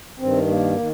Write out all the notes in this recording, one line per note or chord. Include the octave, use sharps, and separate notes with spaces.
G2 D#3 C4
A#3
D#3